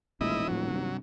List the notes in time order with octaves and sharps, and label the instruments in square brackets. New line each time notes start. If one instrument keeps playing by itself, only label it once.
[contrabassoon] D#1 [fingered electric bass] A1 A#2 G#3 [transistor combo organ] E4 D#5
[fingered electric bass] A2 F3 [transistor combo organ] F#3
[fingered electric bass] G2 C3